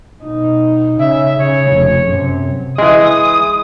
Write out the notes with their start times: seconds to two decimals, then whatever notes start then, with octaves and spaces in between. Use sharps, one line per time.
0.23 B2 D#4
0.99 C#3 E5
1.39 C#3 C#5
1.72 F1
2.06 F#2 C3
2.78 E3 G#3 D#6